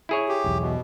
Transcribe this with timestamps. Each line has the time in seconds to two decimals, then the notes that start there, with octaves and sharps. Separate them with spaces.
0.09 E4 G#4 C#5
0.29 G4
0.44 E1 B1 E2
0.60 B2